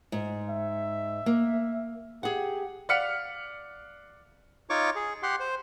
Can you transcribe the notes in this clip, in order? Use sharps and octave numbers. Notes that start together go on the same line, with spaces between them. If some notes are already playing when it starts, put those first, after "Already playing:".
G#2
E5
A#3
G4 G#4 F#5
D5 F5 F#5 F6 B6 C#7
D#4 F4 C#5 C#6 D6
G#4
G4 F#5 C6
C5